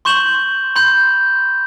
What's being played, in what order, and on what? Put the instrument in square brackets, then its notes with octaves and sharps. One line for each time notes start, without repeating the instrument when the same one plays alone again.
[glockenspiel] C6 C#6 G6 E7 F#7
B5 C6 G6